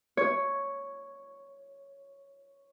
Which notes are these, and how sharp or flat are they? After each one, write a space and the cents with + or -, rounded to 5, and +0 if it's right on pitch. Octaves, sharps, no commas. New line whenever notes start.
C#5 +0